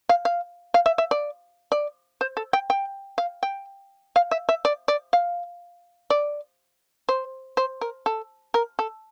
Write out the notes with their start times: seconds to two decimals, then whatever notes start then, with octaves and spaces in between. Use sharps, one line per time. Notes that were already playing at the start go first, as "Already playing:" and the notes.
0.09 F5
0.25 F5
0.74 F5
0.86 E5
0.98 E5
1.11 D5
1.72 D5
2.21 C5
2.37 A4
2.53 G5
2.70 G5
3.18 F5
3.43 G5
4.16 F5
4.31 E5
4.49 E5
4.65 D5
4.88 D5
5.13 F5
6.10 D5
7.09 C5
7.57 C5
7.81 A#4
8.06 A4
8.54 A#4
8.79 A4